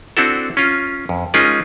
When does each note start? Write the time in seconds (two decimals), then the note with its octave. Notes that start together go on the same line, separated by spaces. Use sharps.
0.17 C4 D4 E4 F#4 A4
0.57 C#4 F4
1.09 F2
1.34 G#3 C#4 D#4 F4 G#4 A#4